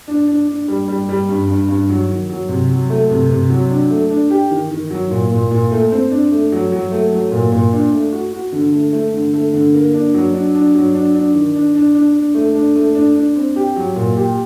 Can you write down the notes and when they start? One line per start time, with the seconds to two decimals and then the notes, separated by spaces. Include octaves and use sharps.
0.08 D4
0.28 D4
0.48 D4
0.68 G3
0.88 G3
1.09 G3
1.29 G2
1.48 G2
1.69 G2
1.89 F#3
2.09 D#3
2.29 F#3
2.49 C3
2.69 F#3
2.90 A3
3.10 C3
3.29 C3
3.50 F#3
3.70 D4
3.90 A3
4.10 D4
4.30 G4
4.51 D#3
4.71 D#3
4.91 F#3
5.11 A#2
5.31 A#2
5.51 A#2
5.71 A3
5.92 C4
6.11 D4
6.32 A3
6.52 F#3
6.72 F#3
6.92 A3
7.12 F#3
7.32 A#2
7.52 A#2
7.73 D4
7.93 A3
8.12 F#4
8.33 F#4
8.52 D3
8.73 A3
8.93 A3
9.13 D3
9.34 A3
9.53 D3
9.73 A#3
9.94 D4
10.14 F#3
10.34 D4
10.55 D4
10.75 F#3
10.94 D4
11.15 D4
11.34 D#3
11.55 D4
11.75 D4
11.95 D4
12.16 D4
12.35 A3
12.55 D4
12.76 A3
12.95 D4
13.16 D4
13.36 C4
13.56 G4
13.76 F#3
13.96 A#2
14.17 G4